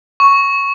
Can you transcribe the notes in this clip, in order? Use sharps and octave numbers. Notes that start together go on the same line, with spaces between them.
C#6